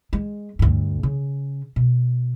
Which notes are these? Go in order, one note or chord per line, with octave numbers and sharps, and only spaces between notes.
G#3
D2 G2
C#3
B2